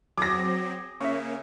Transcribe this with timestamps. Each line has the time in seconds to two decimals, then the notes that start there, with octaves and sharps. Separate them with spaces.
0.17 F#3 C4 G#4 D6 A#6
1.00 C#3 A#3 C#4 E5 C#6